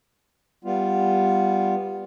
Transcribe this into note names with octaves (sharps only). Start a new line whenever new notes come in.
G3 B3 F4